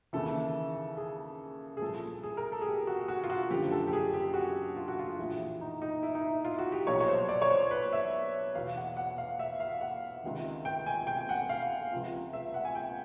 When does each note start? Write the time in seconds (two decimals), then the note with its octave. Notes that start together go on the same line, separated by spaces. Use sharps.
0.13 D#2 C#3 E3 A4
0.97 G#4
1.77 G#4
1.82 C2 A#2 F3 A4
2.23 G#4
2.37 A#4
2.52 A4
2.61 G#4
2.66 G4
2.87 F#4
3.08 F#4
3.24 F4
3.30 F#4
3.50 F#1 F#2 D3 F3 G4
3.71 A4
3.87 G4
3.93 G#4
4.14 G4
4.34 F#4
4.76 F4
4.88 F#4
4.99 F4
5.18 A#1 A2 E3
5.61 D#4
5.82 D#4
6.03 E4
6.15 D#4
6.27 E4
6.45 F4
6.59 F#4
6.72 G4
6.87 B1 A#2 F3 C#5
7.00 C#5
7.08 C5
7.29 D5
7.42 C#5
7.50 C5
7.71 B4
7.93 E5
8.55 E2 B2 F5
8.76 F#5
8.97 F#5
9.18 F5
9.39 E5
9.60 F5
9.81 F#5
10.24 C#2 C3 D#3
10.65 G5
10.86 G#5
11.07 G5
11.29 F#5
11.49 F5
11.92 C#2 C3 F3
12.33 E5
12.54 F#5
12.65 G#5
12.75 G5